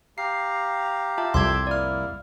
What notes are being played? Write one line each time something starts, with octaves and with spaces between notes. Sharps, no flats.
G4 F5 A#5 C7
F4 E5 A5
C2 F2 E5 G5 C6 D6 E6 G#6
A#3 E4 D5 F6